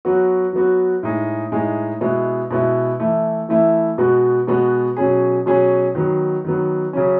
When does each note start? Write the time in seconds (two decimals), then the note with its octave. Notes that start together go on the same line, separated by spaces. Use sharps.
0.05 F#3 B3 F#4
0.53 F#3 B3 F#4
1.03 A2 G#3 D#4 G#4
1.52 A2 G#3 D#4 G#4
2.01 B2 G#3 B3 E4
2.51 B2 G#3 B3 E4
3.00 E3 A3 E4
3.49 E3 A3 E4
3.98 B2 G#3 B3 F#4
4.47 B2 G#3 B3 F#4
4.97 B2 F#3 C#4 G#4
5.46 B2 F#3 C#4 G#4
5.95 D#3 F#3 B3
6.44 D#3 F#3 B3
6.93 C#3 F#3 C#4